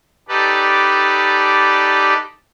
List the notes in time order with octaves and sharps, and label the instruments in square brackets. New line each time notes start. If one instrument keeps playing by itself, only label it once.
[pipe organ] D#4 G4 A4 B4 D5